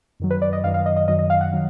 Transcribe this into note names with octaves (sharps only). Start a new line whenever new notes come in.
F#2 D#3 F#3
B4
D5
D#5
F#2 D#3 F#3 F5
F5
D#5
D#5
F#2 D#3 F#3 D#5
D#5
F5
F#5
D#3 F#3